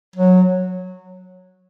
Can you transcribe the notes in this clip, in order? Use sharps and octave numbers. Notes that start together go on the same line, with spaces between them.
F#3